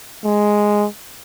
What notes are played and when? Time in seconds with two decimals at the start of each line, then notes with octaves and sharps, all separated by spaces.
0.24 G#3